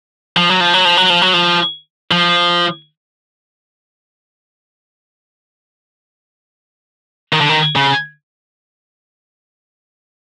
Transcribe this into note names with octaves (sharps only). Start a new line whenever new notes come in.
F3
F#3
F3
F#3
F3
F#3
F3
F#3
F3
F3
D#3
D3
D#3
C#3